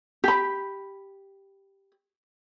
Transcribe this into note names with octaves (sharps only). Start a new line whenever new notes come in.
G4 B5